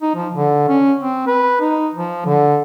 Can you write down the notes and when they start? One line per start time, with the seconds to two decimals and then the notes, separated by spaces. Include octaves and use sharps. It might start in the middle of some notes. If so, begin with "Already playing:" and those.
0.02 D#4
0.16 F3
0.34 D3
0.68 C#4
1.00 C4
1.27 B4
1.61 D#4
1.95 F3
2.26 D3